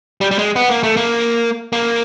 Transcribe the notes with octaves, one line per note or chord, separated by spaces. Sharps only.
G3
G3
G#3
B3
A#3
A3
A#3
A#3